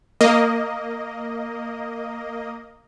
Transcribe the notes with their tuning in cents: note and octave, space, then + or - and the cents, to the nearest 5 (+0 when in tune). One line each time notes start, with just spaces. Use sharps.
A#3 -5 D#5 +0